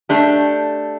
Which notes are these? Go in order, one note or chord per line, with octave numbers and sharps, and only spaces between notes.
A3 D4 G4